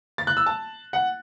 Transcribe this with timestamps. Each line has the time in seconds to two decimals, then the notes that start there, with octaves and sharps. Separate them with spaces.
0.18 A6
0.27 F#6
0.37 E6
0.46 A5
0.93 F#5